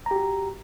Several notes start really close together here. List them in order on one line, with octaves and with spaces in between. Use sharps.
A#5 G4 F#4